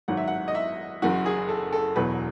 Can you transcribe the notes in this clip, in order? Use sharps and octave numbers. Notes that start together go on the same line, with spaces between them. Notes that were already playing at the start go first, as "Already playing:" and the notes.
G#1 G#2 F#3 F#5
E5
F#5
D#5
E5
F#1 F#2 E3 F#4
G#4
A4
A4
E1 E2 B2 F#3 B4